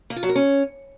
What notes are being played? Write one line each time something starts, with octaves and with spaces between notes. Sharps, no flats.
A#3
F4
F#3
A#4
C#4